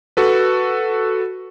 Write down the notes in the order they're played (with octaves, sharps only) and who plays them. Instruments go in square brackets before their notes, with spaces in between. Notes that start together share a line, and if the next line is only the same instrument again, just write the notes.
[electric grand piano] F#4 A4 B4